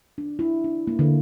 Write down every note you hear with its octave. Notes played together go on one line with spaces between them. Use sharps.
D4
E4
D4
A#3
D3